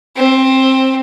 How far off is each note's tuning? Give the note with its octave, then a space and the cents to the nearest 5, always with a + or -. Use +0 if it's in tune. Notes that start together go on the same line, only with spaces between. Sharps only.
C4 +15